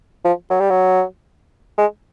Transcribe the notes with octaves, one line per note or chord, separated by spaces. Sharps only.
F3
F#3
G3
F#3
G#3